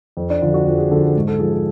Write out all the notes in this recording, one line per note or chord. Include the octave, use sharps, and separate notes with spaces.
F2
D4
D3 F3 F4
F#4
F2 F4
G#4
D3 F3 A4
A4
G#2
A4
F3 G#4
A4